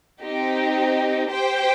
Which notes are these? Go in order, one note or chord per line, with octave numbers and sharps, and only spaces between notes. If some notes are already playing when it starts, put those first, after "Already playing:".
C4 D#4 G4
G4 C5 G5